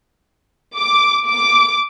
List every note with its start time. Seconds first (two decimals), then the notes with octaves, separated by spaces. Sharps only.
0.76 D6
1.26 D6